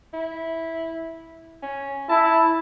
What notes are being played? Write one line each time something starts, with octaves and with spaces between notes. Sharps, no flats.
E4
C#4
E4 A5